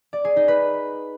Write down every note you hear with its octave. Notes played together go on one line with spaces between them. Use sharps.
D5
G#4
D#4
B4